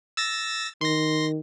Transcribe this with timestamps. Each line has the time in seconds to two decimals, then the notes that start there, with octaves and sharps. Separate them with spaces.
0.17 E6 A6 A#6
0.81 D#3 C6 A#6